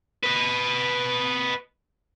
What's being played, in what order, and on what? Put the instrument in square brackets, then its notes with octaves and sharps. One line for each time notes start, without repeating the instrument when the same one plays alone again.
[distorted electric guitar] B4 D#5